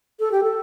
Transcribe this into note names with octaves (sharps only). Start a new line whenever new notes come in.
A4
G4
A4